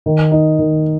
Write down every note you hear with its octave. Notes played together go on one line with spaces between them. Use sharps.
D#3
D#4
D#3